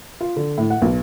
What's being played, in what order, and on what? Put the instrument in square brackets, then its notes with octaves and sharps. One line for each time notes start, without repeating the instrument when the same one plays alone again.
[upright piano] F4
D3
A2
F#5
B1